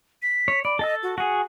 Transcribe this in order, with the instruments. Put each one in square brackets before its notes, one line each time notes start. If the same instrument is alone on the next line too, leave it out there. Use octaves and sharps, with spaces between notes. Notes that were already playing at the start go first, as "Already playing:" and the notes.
[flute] B6
[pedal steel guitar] C#5
[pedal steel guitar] D5 [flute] B5
[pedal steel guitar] A4 A5 E6 [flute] D#5
[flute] F#4
[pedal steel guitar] F#4 G#4 [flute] F#5